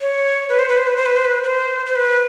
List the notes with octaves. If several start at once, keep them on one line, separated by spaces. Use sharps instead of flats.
C#5
B4
C5
B4
C5
B4
C5
B4
C5
B4
B4
C5
C5
B4